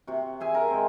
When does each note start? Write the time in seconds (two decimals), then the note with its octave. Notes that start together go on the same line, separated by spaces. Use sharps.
0.07 C3 F#4
0.40 G#4 E5 G#5
0.54 A#4 A#5
0.71 G#3 C4